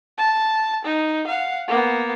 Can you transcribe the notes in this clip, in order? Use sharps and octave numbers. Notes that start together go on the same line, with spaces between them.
A5
D#4
F5 F#5
A#3 B3